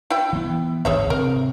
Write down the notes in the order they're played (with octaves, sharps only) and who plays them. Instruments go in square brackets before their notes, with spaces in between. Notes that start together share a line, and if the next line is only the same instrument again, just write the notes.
[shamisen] E4 G5
[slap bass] E3 B3
[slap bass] G#1 D2 [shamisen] G#4 C#5 E5
[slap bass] C3 C4 [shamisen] A#4